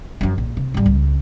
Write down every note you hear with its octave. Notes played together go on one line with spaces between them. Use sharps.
F#2 F3
A#1
C3
G#1 G3
C#2